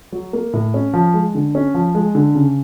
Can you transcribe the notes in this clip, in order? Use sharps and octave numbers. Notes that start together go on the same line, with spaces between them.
F#3
A#3
A2
C#4
F3
G#3
D3
C#4
F3
G#3
D3
C#3